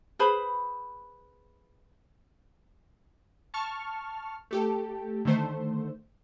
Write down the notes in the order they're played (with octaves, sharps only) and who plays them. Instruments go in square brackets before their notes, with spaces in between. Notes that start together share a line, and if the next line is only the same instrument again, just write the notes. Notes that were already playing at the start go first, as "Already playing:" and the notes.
[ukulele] G#4 B4 C5 B5
[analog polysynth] A5 C#6 F6
A3 G4 A4
D3 D#3 A3 C5